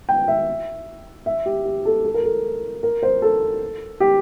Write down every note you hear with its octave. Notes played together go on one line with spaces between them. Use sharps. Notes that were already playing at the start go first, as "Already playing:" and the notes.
G5
E5
E5
G4
G4
A4
A4
A#4
A4
A#4
C5
A4
G4